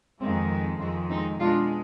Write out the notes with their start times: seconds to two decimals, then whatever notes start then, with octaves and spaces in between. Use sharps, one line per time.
0.21 F2 D#3 G#3 C4
0.51 C4
0.80 F2 D#3 G#3 C4
1.10 C4 D#4
1.39 B2 G#3 D4 F4